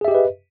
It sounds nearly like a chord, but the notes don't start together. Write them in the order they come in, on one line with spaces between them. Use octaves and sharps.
G#4 E5 G4 D#5 B4